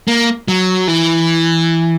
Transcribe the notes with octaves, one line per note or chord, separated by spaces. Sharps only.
A#3
F#3
E3